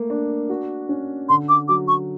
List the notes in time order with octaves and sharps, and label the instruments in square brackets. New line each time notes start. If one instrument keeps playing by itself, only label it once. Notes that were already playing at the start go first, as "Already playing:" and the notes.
Already playing: [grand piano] A3 A#3
D4
F#4
C#4
[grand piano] D3 [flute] C6
[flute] D6
[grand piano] F#3 [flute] D6
[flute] C#6